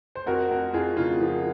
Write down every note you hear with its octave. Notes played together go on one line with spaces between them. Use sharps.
C5
F2 F#4 A#4
F2
F2 F4 G#4
C#3 F4
F3